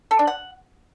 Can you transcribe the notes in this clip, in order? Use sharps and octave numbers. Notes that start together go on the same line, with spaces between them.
A4
D4
F#5